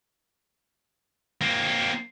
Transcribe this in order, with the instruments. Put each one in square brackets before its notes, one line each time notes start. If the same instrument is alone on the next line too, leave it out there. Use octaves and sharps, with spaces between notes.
[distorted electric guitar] A#3 C4